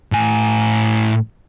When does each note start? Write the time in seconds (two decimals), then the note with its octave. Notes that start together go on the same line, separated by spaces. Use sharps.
0.12 A2 G#5